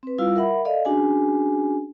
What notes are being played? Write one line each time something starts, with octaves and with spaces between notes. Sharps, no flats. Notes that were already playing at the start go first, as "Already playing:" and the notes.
C4 B4
G3 E4 F4 F5 E6
A#4 E5 F#5 B5
A4 D5 D#5 F5
C#4 D4 F#4 G#4 G#5